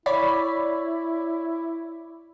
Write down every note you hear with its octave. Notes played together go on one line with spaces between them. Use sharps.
E4 C#5 D5 B5